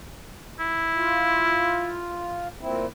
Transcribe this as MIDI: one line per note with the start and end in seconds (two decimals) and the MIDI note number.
0.60 2.04 64
0.96 2.48 65
2.61 2.86 46
2.61 2.86 60
2.61 2.86 64